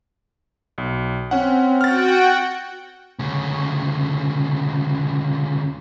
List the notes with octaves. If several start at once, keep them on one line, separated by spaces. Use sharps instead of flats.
B1
C4 C#4 F#5
F#4 F#5 G5 F6 A6
D2 C#3